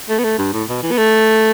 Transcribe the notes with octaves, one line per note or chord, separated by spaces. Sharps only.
A3
B3
A3
G2
A2
B2
E3
B3
A3